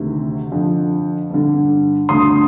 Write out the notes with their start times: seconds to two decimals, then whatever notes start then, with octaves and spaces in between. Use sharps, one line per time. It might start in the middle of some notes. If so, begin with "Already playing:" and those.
Already playing: D2 C3 D#3
0.52 F2 D3
1.30 G2 D3
2.09 D2 D3 C6 D#6